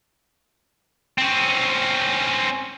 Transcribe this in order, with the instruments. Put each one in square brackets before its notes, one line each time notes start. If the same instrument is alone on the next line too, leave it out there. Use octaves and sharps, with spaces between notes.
[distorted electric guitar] C4 C#4